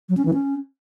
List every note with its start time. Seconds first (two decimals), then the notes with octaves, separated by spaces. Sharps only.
0.09 F#3
0.17 C#4
0.25 E3
0.34 C#4